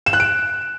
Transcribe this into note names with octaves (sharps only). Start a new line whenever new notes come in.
E7
F#6
D7